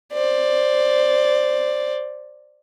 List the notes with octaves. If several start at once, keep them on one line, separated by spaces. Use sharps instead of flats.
C5 D5